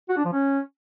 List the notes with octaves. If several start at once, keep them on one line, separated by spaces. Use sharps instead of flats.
F#4
D4
F3
C#4